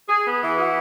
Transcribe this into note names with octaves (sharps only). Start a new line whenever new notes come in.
G#4
B3
E3
F#4